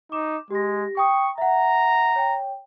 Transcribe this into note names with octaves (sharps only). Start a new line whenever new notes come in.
D#4 D6 E7
G#3 G4 A#6
G5 C#6 D#6
E5 F#5 A#5
C#5 G5